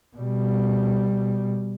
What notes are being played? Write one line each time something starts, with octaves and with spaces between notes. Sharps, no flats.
B2 G3